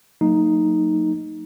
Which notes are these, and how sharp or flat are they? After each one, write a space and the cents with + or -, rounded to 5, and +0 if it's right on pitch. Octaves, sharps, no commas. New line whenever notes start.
F#3 -25 A#3 -40 D#4 +0